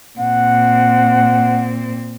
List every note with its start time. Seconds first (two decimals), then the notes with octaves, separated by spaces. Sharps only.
0.19 A#2 C4 F#5